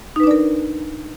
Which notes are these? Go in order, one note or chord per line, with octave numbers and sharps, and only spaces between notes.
D4 D#4 A#4 B4 D5